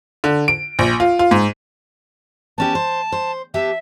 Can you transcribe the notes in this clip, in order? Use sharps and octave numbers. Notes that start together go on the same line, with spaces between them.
D3
D7
A#1
F4
F4
G#2
B3 C#4 G4 A5
C5
C5
B3 G4 E5 A5